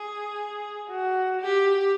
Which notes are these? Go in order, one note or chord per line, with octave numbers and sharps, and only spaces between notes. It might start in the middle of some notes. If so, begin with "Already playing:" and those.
Already playing: G#4
F#4
G4